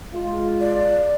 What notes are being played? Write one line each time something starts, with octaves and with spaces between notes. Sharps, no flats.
G#3 F4
D5